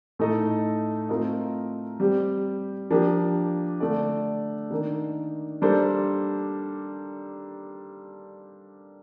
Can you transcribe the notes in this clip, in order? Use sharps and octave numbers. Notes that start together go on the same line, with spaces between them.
A2 A3 D#4 A4 D#5
A3 C4 F4 A#4 D#5
G3 C4 G4
F3 A#3 D4 G4
D3 A3 D4 A4 D5
D#3 A#3 D4
G3 A#3 D4 A4 C5